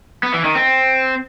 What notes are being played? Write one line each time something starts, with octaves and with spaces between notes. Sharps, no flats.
B3
E3
D#3
C4